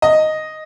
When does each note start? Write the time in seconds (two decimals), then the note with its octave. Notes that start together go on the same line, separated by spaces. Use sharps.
0.02 D#5